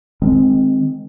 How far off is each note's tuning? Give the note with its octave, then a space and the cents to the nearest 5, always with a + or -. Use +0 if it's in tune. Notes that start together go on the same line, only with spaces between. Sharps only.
D#3 -15 G#3 +0 C4 +0